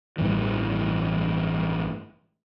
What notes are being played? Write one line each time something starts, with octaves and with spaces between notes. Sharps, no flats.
A1 G2 D#3 E3